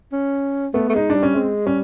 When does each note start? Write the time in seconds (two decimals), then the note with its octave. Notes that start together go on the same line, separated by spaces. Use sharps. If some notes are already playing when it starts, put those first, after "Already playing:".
0.12 C#4
0.74 A3 B3
0.89 A3
0.94 G#3 D#4
1.10 D4
1.15 G3
1.23 C#4
1.36 G#3 C4
1.67 G3 C#4